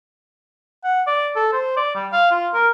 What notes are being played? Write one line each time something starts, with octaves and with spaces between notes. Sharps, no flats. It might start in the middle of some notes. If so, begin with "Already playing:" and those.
F#5
D5
A4
C5
D5
G3
F5
F4
A#4